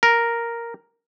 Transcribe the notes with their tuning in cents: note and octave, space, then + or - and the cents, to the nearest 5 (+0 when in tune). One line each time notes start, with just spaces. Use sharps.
A#4 +0